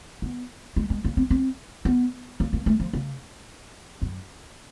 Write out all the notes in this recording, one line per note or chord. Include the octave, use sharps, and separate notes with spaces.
B3
G#3
G#3
A#3
C4
C4
B3
A#3
A#3
A3
F3
C#3
F#2